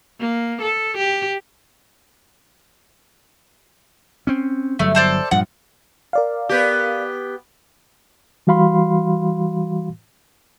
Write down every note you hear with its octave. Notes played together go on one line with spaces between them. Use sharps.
A#3
A4
G4
C4 C#4
G1 F#3 G3 A3
A4 C5 D5
G2 A#2 F3 F#5
A#4 D5 F5
B3 G4
E3 G3 F#4 F5 B5 C6